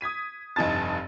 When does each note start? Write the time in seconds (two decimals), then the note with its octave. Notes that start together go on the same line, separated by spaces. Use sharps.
0.01 D#6 G#6 B6 D#7
0.56 F1 G2 D#4 G#5 A5 A6